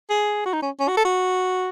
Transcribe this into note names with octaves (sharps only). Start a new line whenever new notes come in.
G#4
F#4
D#4
C#4
C#4
F#4
A4
F#4